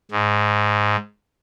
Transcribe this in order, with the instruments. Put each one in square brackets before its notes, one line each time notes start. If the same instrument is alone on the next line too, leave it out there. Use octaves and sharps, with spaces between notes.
[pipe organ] G#2